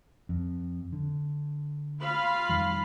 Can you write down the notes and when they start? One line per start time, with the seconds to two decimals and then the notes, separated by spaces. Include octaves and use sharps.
0.29 F2
0.92 D3
2.02 F4 F5 B5
2.49 F2 D#3 G3